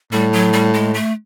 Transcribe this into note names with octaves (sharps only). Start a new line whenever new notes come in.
A2 G3
F#3
G3
G#3
A3